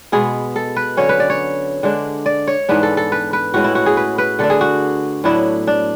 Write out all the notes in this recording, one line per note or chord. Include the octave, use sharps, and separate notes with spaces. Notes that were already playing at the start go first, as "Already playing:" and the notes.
B2 G#3 B3 G#4
A4
B4
D3 F#3 C#4 C#5
B4
D5
C#5
D3 G#3 D4
D5
C#5
G#2 E3 B3 D4 B4
A4
A4
B4
B4
A2 G#3 C#4 F#4
E4
F#4
G#4
B4
B4
D3 A3 D4 A4
G#4
F#4
A2 F#3 B3 D4 E4
D4